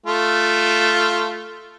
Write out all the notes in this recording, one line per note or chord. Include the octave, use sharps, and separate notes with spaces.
A3 F4